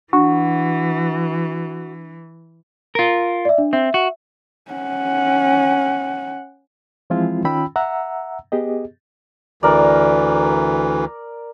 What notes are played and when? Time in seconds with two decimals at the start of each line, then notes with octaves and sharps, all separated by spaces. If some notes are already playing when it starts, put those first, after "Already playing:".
0.13 E3 D4 F#4
2.95 F4 A#4
3.45 D5 E5
3.58 D4
3.73 C4 E5
3.94 F#4
4.72 C#4 F#5
7.10 E3 F3 G#3 C4 E4 F4
7.45 D#3 C#4 F4 G5 B5 E6
7.76 E5 F#5 A#5 E6
8.52 B3 G4 G#4 D#5
9.63 D2 E3 A#4 D5